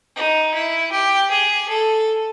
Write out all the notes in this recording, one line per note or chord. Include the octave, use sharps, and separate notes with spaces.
D#4
E4
G4
G#4
A4